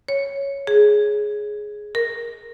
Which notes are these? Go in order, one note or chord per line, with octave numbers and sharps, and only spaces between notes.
C#5
G#4
A#4